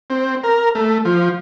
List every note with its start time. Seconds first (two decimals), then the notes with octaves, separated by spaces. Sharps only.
0.10 C4
0.44 A#4
0.75 A3
1.05 F3